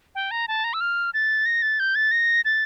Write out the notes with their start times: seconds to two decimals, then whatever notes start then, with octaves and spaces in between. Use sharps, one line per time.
0.15 G5
0.31 A#5
0.48 A5
0.64 A#5
0.74 E6
0.81 F6
1.14 A6
1.46 A#6
1.62 A6
1.80 G6
1.95 A6
2.11 A#6
2.45 A6